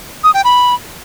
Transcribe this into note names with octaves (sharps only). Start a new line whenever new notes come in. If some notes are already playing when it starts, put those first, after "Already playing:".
D#6
G5
B5